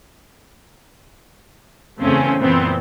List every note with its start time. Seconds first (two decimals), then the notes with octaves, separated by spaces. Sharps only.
2.00 E2 C#3 A3 C4 C#4
2.40 F#2 A#2 E3 A3 B3 C4